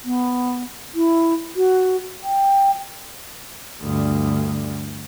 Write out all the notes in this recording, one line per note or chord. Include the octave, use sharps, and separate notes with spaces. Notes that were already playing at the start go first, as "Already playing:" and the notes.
B3
E4
F#4
G5
D2 G2